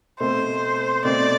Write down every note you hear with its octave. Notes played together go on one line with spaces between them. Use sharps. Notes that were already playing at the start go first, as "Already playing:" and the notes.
B2 A3 C4 C5
B2 A3 C4 D5